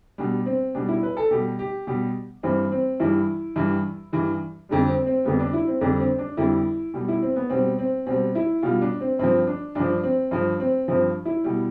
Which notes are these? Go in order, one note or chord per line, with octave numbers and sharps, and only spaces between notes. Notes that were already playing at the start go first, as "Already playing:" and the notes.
B2 G3 D4
C4
B2 G3 D4
E4
B4
A4
B2 G3 G4
G4
B2 G3 G4
G2 E3 G3 C4
C4
G2 E3 G3 E4
G2 E3 G3
G2 E3 G3
F2 D3 G3
C4
C4
F2 D3 G3 B3
D4
E4
C4
F2 D3 G3 D4
C4
D4
F2 D3 G3 E4
B2 G3
E4
C4
B3
B2 G3 C4
C4
B2 G3 C4
E4
B2 G3 F4
D4
C4
G2 F3 C4
D4
G2 F3 D4
C4
G2 F3
C4
G2 F3 C4
E4
B2 G3